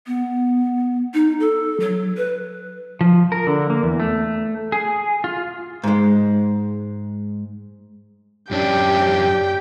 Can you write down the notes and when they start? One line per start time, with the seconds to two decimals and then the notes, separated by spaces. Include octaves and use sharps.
0.07 B3
1.14 D#4
1.40 A4
1.80 F#3
2.17 B4
3.01 F3
3.32 A#4
3.47 D3
3.70 A#3
3.83 E2
4.00 A3
4.72 G#4
5.24 F4
5.84 G#2 G#3
8.51 F#2 C#4 D4 G4 G5